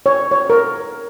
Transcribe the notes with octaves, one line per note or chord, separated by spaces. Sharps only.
C#5
C#5
A#4